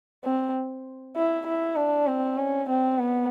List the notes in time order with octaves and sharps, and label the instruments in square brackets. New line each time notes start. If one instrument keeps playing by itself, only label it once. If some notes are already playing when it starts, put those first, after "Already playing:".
[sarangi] C4
E4
E4
D4
C4
C#4
C4
B3